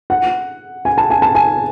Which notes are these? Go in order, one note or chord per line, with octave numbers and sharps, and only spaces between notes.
F#5
G#5
A5
G#5
A5
G#5